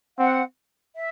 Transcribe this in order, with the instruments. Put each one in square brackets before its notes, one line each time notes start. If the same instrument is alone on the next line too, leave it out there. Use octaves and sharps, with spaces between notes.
[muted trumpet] C4 [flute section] F#5
[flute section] E5